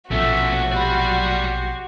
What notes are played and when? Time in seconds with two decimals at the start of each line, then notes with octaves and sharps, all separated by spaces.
0.11 A#1 B2 F3 A3 C#4 F#4 E5
0.72 G4 D5 B5 C6